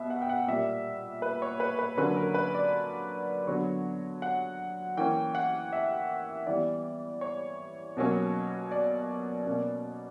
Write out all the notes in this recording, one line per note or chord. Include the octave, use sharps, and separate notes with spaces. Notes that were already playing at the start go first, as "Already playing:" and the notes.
Already playing: B2 E5
F#5
G5
F#5
A#2 G3 A#3 E5
B4
C#5
B4
B4
D3 F#3 A#3 C#4 B4
A#4
B4
D5
D3 F#3 B3 C#5
F#5
E3 A#3 C#4 G5
F#5
E5
E3 G3 B3 D5
C#5
B2 F#3 A#3 C#4
D5
B2 A#3 C#4